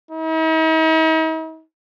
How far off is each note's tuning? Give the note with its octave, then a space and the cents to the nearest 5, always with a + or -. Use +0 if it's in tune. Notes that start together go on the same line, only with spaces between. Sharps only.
D#4 +45